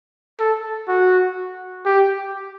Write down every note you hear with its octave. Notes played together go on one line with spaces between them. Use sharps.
A4
F#4
G4